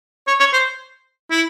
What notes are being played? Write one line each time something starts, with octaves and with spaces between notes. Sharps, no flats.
C#5
C#5
C5
E4